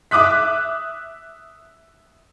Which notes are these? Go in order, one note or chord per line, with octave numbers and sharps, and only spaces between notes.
E5 D6 D#6 F#6 B6